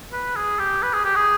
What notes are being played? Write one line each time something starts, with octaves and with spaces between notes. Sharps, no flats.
B4
G#4
G4
B4
G#4
G4
G#4